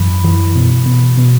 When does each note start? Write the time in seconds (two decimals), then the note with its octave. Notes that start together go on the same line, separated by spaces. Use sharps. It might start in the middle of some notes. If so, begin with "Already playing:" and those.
Already playing: F#2 E3 B5
0.24 E3
0.55 B2
0.86 B2
1.18 B2